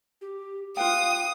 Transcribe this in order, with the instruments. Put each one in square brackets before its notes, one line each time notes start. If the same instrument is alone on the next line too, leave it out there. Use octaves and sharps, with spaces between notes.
[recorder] G4
[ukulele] F4 B4 G5 [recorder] F5 [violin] D#6